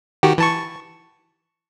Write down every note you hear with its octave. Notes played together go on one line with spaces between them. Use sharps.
D#3 F#4 G4
E3 A5 C#6